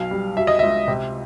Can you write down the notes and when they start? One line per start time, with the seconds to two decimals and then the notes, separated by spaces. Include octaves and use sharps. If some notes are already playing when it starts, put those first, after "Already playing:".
Already playing: B1 F#3 F5
0.11 G3
0.37 F#3 E5
0.47 D#5
0.59 C#2 E5
0.88 C3